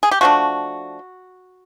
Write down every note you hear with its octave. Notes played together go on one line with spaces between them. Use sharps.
G#4
G4
F3 A3 D4 F#4